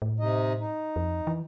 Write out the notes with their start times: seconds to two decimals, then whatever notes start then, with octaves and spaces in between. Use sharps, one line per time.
0.02 A2
0.20 C3 D#4 D#5
0.60 D#4
0.96 F2
1.27 E3